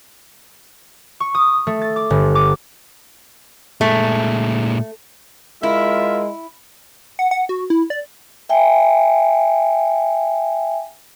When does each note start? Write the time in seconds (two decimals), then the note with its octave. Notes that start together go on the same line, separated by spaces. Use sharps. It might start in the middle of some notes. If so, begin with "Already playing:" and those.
1.20 C#6
1.35 D#6
1.67 A3
1.82 A6
1.96 D6
2.10 G1
2.35 D6
3.81 A#2 G#3 A3
5.63 G#3 E4 F4 A#4 E5
7.19 F#5
7.31 F#5
7.49 F#4
7.70 E4
7.90 D5
8.49 E5 G5 G#5